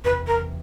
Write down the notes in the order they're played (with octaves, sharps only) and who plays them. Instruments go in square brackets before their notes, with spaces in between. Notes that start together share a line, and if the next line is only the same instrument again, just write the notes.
[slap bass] F#1 E2 C3 E3 [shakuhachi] B4
[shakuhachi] A#4